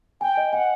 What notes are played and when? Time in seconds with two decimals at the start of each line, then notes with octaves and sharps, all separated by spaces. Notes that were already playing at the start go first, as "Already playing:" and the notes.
0.21 G5 G#5
0.37 D#5
0.53 F#5 G#5